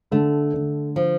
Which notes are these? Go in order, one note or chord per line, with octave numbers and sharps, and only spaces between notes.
D3 A3
D3
F3